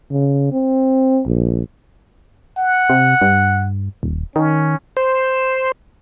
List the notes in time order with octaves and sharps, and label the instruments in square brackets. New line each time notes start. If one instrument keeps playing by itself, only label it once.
[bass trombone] C#3
C4
A#1
[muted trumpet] F#5
[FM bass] C3
G2
D#1
[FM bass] D#3 [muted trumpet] C#4
[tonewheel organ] C5